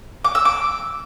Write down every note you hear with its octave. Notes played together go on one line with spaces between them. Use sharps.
D6
E6
D6